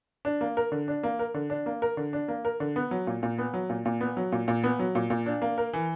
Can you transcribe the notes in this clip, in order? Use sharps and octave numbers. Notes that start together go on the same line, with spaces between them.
D4
A#3
A#4
D3
D4
A#3
A#4
D3
D4
A#3
A#4
D3
D4
A#3
A#4
D3
B3
F#3
A#2
A#2
B3
F#3
A#2
A#2
B3
F#3
A#2
A#2
B3
F#3
A#2
A#2
D4
A#3
A#4
E3